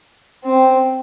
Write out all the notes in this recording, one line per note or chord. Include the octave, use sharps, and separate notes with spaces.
C4